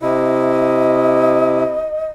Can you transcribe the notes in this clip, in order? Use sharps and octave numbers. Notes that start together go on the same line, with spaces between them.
C3 E4 D#5